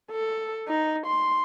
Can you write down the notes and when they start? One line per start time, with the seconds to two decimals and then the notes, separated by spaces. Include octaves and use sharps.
0.12 A4
0.68 D#4
1.06 C6